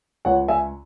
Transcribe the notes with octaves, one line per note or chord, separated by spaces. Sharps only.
C#2 C#5 F#5
E5 G#5